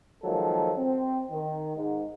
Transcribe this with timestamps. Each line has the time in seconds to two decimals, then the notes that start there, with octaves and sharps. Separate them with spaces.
0.24 D#3 F3 F#3 G#3 A#3 A4
0.78 C4
1.31 D#3
1.76 G#2